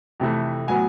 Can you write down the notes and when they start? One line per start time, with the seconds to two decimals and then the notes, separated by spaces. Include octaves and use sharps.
0.20 F2 C3 E3 A3
0.67 A2 F#3 B3 G#5